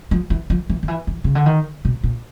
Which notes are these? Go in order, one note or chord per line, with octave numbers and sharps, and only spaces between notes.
F3
E3
F3
E3
D#3
E3
E3
C#3
D3
D#3
B2
A#2